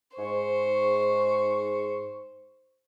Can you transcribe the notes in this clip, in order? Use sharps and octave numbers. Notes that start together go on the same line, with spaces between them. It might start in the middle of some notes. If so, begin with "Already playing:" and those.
G#2 C5 C#6